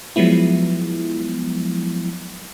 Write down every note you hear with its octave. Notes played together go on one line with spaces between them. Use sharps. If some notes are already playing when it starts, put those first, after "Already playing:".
F3 F#3 G#3 B3 E4